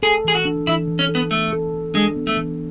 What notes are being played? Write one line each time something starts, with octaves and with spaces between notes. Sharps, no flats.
G#4 A4
E3 G#4
F#4
D4
E3 E4
E3
C#4
A4
B3
A3 B3
A4
E3
G#3 D4
B3
A3
E3